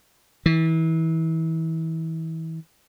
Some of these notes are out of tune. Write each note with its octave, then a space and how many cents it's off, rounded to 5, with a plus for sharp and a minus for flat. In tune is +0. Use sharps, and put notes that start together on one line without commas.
E3 -30